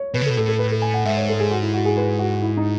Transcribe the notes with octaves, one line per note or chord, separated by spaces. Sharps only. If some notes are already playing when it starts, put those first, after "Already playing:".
Already playing: C#5
B2 B4
C#3
A4
B2
A2 A4
A4
B4
A4
G#5
F#5
G#2 E5
C#5
A4
G#4
F#4
E4
F#4
G#4
B4
F#4
E4
D#4